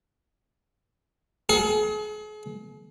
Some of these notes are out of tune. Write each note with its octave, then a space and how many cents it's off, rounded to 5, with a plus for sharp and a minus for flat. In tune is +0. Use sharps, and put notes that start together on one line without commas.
G#4 +40